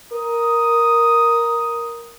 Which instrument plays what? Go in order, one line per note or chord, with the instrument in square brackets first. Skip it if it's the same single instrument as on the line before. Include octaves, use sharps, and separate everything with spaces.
[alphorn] A#4 [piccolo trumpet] D#6